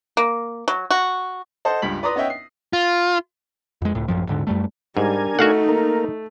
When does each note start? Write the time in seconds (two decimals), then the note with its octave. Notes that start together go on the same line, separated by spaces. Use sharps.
0.17 A#3
0.68 F#3
0.90 F#4
1.65 A4 C5 D#5 F#5 A5
1.82 C#2 G2 B6 F#7
2.03 B4 D5 A#5 C6 D#6 A#6
2.16 B3 C#4 D#5 E5 G5
2.30 C7
2.73 F4
3.82 F2 G#3
3.95 C#2 A2
4.08 A1 F#2 F3
4.28 D#1 G#2 D3
4.47 F#2 G3 A3
4.97 G#2 G3 D4 A#4 G#5
5.39 A3 D#4 F#4 F5 F#5
5.69 A#3 A#4